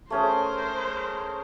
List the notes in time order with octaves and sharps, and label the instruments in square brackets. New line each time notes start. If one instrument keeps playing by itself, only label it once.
[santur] A3 C#4 G#4 [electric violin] A#4 C5